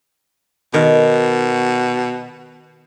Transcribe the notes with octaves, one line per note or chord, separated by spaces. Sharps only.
B2 D#3